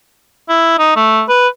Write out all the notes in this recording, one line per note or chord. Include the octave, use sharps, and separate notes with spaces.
E4
D#4
A3
B4